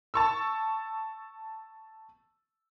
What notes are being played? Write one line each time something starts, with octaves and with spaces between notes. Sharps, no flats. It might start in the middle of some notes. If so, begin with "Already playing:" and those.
A5 C#6 E6